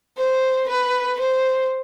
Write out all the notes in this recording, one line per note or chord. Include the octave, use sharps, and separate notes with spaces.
C5
B4
C5